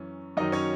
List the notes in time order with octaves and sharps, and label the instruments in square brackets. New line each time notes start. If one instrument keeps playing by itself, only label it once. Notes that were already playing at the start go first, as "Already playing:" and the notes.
Already playing: [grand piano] F#2 E3 C#4
F#2 D#3 F#3 D#4 D#5
C#4 C#5